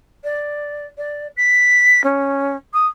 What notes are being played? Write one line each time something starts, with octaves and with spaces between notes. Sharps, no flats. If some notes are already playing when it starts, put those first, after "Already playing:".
D5
D5
B6
C#4
D#6